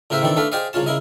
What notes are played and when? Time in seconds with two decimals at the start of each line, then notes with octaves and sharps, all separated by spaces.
0.10 A2 C#3 A#4 C5 E5
0.22 D#3 E3 C4 D4 A4
0.37 A3 D4 A4 B4 F5
0.52 G4 G#4 C5 D5 D#5 F5
0.73 C2 C#3 C#4 F4 A5
0.86 C#3 E4 A#4 D#5